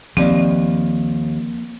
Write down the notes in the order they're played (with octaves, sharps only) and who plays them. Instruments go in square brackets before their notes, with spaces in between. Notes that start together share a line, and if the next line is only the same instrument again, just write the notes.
[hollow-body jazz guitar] D#2 [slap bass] F3 A#3 [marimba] C4 D5